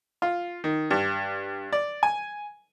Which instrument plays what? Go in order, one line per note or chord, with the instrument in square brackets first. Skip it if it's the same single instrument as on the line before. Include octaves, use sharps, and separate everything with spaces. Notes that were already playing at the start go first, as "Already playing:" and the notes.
[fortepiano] F4
D#3
G2
D5
G#5